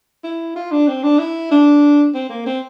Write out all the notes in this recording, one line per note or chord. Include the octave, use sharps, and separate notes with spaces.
E4
F4
D4
C4
D4
E4
D4
C4
A#3
C4